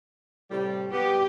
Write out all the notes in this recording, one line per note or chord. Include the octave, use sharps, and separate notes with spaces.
A2 C3 G3
G3 B3 G4